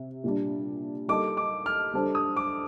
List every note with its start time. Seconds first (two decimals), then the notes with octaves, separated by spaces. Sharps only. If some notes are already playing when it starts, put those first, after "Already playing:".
Already playing: C3
0.24 A#2 G3 D4
1.08 G3 A#3 D#4 A4 D6
1.37 D6
1.66 F6
1.94 G3 D4 A4 C5
2.15 D#6
2.37 D6